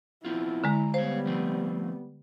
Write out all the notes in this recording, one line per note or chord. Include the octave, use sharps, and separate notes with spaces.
B3 C4 E4 F4
D3 G#3 A#5
G3 B3 C5 C#5 F5
F3 A3 C4